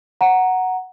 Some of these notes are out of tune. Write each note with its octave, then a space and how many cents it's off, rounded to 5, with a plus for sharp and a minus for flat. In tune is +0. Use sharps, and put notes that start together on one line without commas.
F#5 +0 A#5 +0